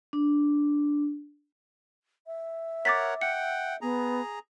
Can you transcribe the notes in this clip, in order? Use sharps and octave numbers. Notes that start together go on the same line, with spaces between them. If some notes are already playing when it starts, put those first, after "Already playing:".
D4
E5
A#4 C#5 F#5 D6 A6 B6
F#5 G5 C#7
B3 G#4 A#5